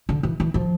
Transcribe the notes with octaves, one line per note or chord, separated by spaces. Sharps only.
D3
E3
E3
F3